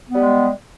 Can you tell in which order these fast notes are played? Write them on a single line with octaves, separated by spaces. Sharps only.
B3 G3 G#3